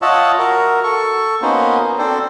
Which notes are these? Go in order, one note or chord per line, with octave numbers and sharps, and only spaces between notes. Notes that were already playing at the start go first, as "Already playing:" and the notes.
F4 C#5 D#5 E5 F#5 A5
F#4 A#4
A4 C#6
A#3 B3 C#4 D#4 F#4 C5
C4 D4 A4 C5